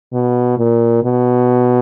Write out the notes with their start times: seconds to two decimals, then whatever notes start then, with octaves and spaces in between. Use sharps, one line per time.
0.13 B2
0.58 A#2
1.03 B2